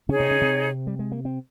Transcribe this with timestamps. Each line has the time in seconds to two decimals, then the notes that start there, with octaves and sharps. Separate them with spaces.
0.09 C#3 C#4 D#4 G#4 C#5
0.20 C3 C4
0.31 C#3 C#4
0.41 C3 C4
0.87 G3
0.99 G#3
1.12 A#3
1.25 C4